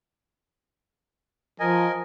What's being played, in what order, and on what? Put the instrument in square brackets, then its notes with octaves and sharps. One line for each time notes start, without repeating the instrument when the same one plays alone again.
[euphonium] F3 [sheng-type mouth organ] A#4 D#5 G#5